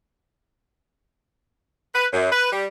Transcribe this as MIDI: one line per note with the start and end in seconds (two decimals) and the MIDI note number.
1.94 2.07 71
2.13 2.29 42
2.32 2.52 71
2.52 2.66 55